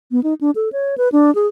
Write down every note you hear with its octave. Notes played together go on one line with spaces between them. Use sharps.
B3
D#4
D4
A4
C#5
B4
D4
G#4